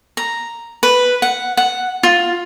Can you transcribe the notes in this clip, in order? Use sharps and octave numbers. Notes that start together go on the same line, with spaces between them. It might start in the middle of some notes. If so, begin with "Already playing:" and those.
A#5
B4
F#5
F#5
F4